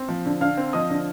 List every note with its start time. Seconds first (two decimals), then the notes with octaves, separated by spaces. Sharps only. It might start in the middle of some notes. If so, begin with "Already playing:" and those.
Already playing: C4
0.08 F3
0.26 D3
0.41 D3 F5 F6
0.57 C4
0.73 F3 D#5 D#6
0.90 D3